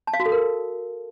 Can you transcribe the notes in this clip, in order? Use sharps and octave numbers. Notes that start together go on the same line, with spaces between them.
A5
F5
F#4
A4
A#4